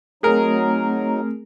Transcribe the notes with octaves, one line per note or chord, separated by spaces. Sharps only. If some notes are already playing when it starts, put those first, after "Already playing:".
F#3 A3 C4 D#4 G#4 A#4